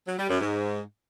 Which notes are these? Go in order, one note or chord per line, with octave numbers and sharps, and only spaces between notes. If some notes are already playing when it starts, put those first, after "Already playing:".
F#3
G3
F#2
G#2